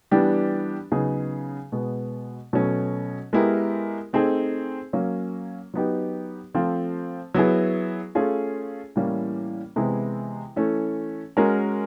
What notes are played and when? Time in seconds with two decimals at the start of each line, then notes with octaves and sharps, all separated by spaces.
0.11 E3 G3 B3 D4 G4
0.92 C#3 F#3 B3 D#4 G#4
1.72 B2 G#3 B3
2.53 B2 F#3 A3 C#4
3.33 G#3 B3 E4 G4 A#4
4.13 A3 C4 D#4 G#4
4.93 F#3 A#3 C#4
5.74 F#3 B3 D#4 G4
6.54 F3 A3 C4 F4
7.35 F#3 B3 E4 G#4
8.15 A3 C#4 F4 G#4
8.96 A2 E3 G3 A#3 C#4
9.76 C3 E3 G#3 B3 E4
10.56 E3 A3 C#4
11.37 G#3 C#4 F#4 A#4